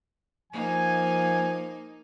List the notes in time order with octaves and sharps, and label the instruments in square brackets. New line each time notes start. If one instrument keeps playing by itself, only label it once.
[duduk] F3 [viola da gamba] A#3 D#4 [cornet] G#5